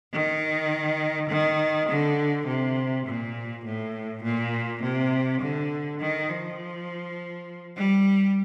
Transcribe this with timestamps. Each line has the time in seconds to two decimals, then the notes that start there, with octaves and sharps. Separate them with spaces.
0.13 D#3
1.30 D#3
1.89 D3
2.47 C3
3.06 A#2
3.65 A2
4.24 A#2
4.83 C3
5.41 D3
6.00 D#3
6.30 F3
7.77 G3